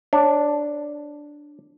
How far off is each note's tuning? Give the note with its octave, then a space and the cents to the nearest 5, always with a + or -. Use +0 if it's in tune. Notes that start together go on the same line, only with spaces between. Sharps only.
D4 +0 C#5 -15